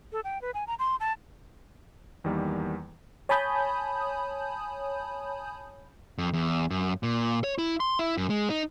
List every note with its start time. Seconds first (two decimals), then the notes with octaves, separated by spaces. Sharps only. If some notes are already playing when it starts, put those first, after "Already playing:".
0.12 A4
0.24 G5
0.42 B4
0.54 G#5
0.67 A#5
0.79 C6
1.00 A5
2.24 E2 D#3 G3 A#3
3.29 C#5 G#5 A5 B5 D#6 G6
6.18 F2
6.33 E2
6.70 F#2
7.03 A#2
7.44 C#5
7.58 E4
7.80 C6
7.99 E4
8.17 F#2
8.30 G#3
8.50 D#4